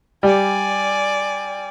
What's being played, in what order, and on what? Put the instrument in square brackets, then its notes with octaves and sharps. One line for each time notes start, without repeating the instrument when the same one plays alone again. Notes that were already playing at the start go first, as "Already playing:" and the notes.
[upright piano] G3 [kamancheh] D5 G#5